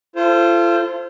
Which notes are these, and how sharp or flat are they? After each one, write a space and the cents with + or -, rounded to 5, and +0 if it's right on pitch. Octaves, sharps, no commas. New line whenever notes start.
F4 -35 A4 +0 C5 +0